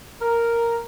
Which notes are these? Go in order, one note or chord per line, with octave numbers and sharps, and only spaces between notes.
A#4